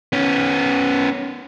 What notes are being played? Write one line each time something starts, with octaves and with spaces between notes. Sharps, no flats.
B3 C#4